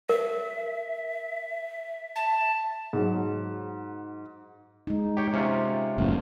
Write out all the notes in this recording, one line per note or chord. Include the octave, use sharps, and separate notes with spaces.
A#4 E5
A5
G#2 F#3
G#3 D#4
G4 C#5 G5
C3 C#4 F4
F#1 F#2 A2